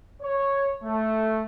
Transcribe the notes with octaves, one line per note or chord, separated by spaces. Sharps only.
C#5
A3